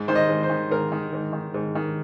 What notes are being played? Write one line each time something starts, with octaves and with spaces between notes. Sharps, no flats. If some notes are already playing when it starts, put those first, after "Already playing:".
Already playing: G#2
D#3 C5
D#5
G#2
C5
D#3
G#2 A#4
D#3
G#2
D#3
G#2
D#3